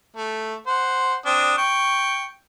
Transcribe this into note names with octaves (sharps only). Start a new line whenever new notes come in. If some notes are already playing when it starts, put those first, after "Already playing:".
A3
C5 F#5
C4 D4 D#6
G5 C#6